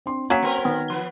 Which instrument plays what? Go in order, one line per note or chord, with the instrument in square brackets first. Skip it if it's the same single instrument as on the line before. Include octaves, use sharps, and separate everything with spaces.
[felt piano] C4 D4 C6
[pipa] F#3 [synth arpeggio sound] A#3 C#4 [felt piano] G#6 B6
[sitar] C4 A#4 B4
[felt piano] D#3 [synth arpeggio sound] B3
[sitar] F3 B3 [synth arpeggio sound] C6